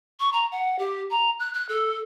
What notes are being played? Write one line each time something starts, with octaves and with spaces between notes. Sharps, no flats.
C#6
A#5
F#5
G4
A#5
F#6
F#6
A4